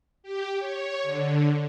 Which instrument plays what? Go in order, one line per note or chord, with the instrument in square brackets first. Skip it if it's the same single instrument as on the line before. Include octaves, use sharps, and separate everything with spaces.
[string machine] G4
C#5
D3